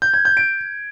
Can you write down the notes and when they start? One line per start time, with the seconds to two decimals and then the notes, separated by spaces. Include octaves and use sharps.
0.02 G6
0.14 G#6
0.25 G6
0.37 D7